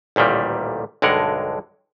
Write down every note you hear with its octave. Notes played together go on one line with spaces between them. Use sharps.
A1 D2 A#2 D#3 G3
B1 G2 D3 G#3 A#4 F#5